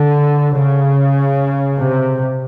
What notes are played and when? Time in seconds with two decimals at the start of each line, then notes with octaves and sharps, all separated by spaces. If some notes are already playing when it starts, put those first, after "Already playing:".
Already playing: D3
0.55 C#3
1.77 C3